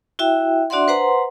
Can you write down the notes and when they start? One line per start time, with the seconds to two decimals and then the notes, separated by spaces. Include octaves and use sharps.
0.19 E4 F#4 E5 G5
0.70 D4 F#4 D5 E5 F#5 C6
0.88 B4 C5 F#5 A#5 C6